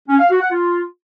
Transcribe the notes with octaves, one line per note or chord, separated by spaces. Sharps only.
C#4
F5
F#4
F#5
F4